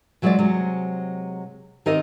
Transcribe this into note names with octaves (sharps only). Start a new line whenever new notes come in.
E3 F#3 G#3 F4 F#4 D5
C3 F#3 G#3
D#3 C4 D#4 G4 A#4 D#5